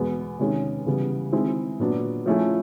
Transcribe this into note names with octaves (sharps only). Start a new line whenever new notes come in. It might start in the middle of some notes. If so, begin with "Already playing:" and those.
Already playing: E2 B2 G#3 B3
C3 D#3 G#3 C#4
C#3 E3 G3 B3
D#3 G#3 C4 E4
A#2 F#3 B3 D4
F3 A3 C#4 E4 G#4